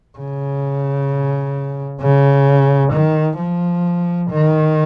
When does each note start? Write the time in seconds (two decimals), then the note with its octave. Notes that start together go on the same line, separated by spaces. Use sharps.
0.18 C#3
2.01 C#3
2.92 D#3
3.38 F3
4.29 D#3